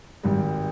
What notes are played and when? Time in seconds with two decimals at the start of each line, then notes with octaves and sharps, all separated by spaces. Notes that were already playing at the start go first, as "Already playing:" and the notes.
0.23 G#1 G#2 G3